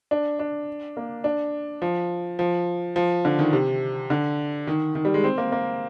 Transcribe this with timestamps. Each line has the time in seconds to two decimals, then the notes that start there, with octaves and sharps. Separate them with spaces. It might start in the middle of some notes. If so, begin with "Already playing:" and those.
0.11 D4
0.39 D4
0.97 A#3
1.24 D4
1.82 F3
2.39 F3
2.96 F3
3.25 D3
3.39 D#3
3.53 C3
4.10 D3
4.67 D#3
4.95 D#3
5.05 G3
5.14 G#3
5.24 C4
5.38 A#3
5.52 A#3